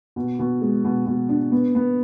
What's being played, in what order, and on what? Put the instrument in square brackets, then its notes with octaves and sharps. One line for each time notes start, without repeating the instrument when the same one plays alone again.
[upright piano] B2
B2
G#3
B2
B2
D4
B3
B3